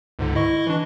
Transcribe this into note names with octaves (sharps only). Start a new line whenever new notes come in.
C#2 G#2 D3
E4 D#5 C#6
E3 D4